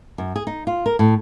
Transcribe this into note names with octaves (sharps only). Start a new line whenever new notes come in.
F#2
G#4
D#4
F4
A#4
A2